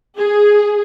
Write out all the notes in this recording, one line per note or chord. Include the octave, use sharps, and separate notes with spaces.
G#4